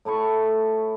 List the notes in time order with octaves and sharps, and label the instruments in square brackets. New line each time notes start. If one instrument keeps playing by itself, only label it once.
[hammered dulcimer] A2 A3 E4 C#6